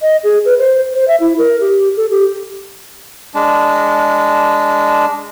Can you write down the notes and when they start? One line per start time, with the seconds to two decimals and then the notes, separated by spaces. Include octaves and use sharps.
0.01 D#5
0.24 G#4
0.45 B4
0.59 C5
0.94 C5
1.08 E5
1.20 E4
1.38 A#4
1.61 G4
1.97 A4
2.11 G4
3.34 G#3 D4